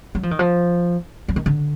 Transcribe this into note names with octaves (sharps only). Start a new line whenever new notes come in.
F#3
F3
D#3
F3
F#3
D#3
D3